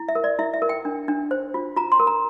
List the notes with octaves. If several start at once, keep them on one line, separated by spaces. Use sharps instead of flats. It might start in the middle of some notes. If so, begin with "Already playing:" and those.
Already playing: E4
E5
A#4
D5
E4 E5
E5
A#4
G5
D4
D4
C5
F4
F4 A#5
C6
A#4
A#5